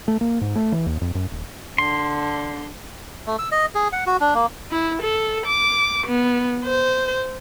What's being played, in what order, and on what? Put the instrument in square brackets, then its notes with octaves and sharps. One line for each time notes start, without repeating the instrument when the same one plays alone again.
[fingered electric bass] A3
A#3
G#2
A3
E3
D#2
F2
F#2
D#1
[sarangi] D3 [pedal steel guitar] C6
[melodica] A3
E6
D#5
G#4
F#5
F#4
D4
A#3
[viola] E4
A4
D6
B3
C5